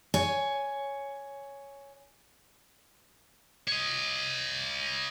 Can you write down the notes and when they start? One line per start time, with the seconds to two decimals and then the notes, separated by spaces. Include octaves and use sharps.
0.14 C#5 G#5
3.68 C#5 D#5